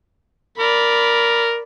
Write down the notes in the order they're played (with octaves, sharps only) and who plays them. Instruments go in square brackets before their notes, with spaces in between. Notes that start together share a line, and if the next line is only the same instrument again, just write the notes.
[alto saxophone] A#4 [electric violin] D5 B5